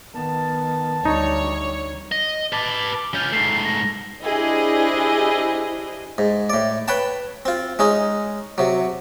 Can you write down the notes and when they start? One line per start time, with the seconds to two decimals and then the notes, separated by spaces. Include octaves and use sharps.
0.15 D#3 B3 A5
1.05 D2 G3 D#4 C#5
2.12 D#5
2.53 B4 A5 D6
2.77 D6
3.14 C#4 F4 G6
3.33 G#2 A3 C7
3.65 A#6
4.23 D4 E4 G4 G#4 C5 D#5
6.18 G#2
6.50 A2 D5
6.88 B4 C#5 G5 A5
7.45 C4 F4
7.79 G#3 C#4 D#4
8.58 C3 F#3